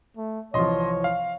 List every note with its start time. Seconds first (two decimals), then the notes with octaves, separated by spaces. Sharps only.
0.17 A3
0.54 C2 E3 F3 C#5 D#5 C6
1.04 F5